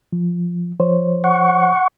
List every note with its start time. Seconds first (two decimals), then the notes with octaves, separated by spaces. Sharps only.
0.13 F3
0.79 F3 C5 C#5
1.24 F#5 C#6